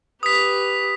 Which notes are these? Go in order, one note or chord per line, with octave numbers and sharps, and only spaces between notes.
G4 B4 D#6 B6